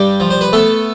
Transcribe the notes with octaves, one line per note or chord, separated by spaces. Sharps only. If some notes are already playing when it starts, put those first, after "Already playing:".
Already playing: G2 G3 G4
F3
C5
B4
A3 B3 A4